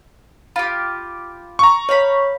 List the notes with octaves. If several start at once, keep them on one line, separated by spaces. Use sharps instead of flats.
F4 G4 B5
A#5 C#6
C#5 F5 B5